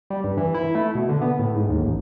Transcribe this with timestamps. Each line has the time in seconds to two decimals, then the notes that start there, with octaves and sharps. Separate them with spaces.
0.10 G3
0.24 G2
0.37 E3
0.54 E4
0.75 A3
0.95 B2
1.09 D3
1.22 B3
1.39 A2
1.55 G#2
1.69 D#2
1.83 A1